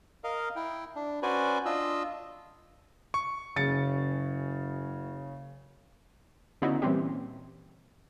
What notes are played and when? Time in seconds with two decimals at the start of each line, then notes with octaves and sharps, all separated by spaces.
0.24 A#4 D#5 F5
0.56 E4 G5
0.96 D4
1.23 C#4 F#4 B4 C5 D5 G#5
1.65 D4 F4 D#5 E6
3.14 C#6
3.56 F#1 C#3 A6 C#7
6.62 D3 B3 C#4 D#4 E4 F#4
6.82 A#2 E3 G3 C4 C#4 G4